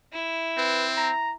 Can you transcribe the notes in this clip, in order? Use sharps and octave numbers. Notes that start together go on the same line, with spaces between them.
E4
C4 B4
A#5